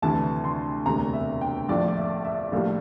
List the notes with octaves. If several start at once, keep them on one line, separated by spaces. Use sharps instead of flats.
D2 C3 E3 A5
C6
E1 D2 C3 A#5
E5
G5
A#1 A2 F3 D5
E5
E5
A#1 A2 G3 A#3